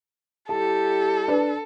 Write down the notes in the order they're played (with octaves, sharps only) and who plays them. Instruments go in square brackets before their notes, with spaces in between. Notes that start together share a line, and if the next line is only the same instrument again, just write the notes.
[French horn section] G3 E4 G4 [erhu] A4 [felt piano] A5
[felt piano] D4 B4